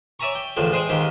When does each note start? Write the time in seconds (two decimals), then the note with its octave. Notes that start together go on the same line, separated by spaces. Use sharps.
0.20 C#5 D5 E5 G#5 A#5 C#6
0.35 G5
0.57 E2 A2 D3 F3
0.72 G#3 G#4 C5 G5 G#5
0.89 D#2 G#2 D#3 G4